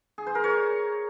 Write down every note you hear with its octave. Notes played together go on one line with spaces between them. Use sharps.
G#4
C5
A#4
C#5